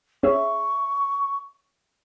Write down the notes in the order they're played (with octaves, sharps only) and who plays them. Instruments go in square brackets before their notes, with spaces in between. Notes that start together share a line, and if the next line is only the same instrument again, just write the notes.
[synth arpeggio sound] C#4 G#4 E5 [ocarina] C#6